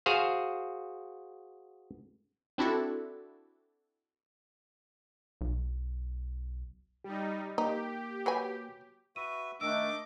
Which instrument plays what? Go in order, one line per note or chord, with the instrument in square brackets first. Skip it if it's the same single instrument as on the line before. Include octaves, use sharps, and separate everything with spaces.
[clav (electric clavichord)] F#4 G#4 C5 F5
[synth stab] C4 D4 E4 F#4 A4
[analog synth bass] B1
[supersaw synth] G3 D#4 [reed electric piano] G4
[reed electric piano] A#3 [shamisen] D#4 [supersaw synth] G4
[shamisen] F#3 B4 G#5
[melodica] F#4 B4 E5 [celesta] D#7
[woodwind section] D#3 A3 D4 [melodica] D#5 [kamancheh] D6 [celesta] E6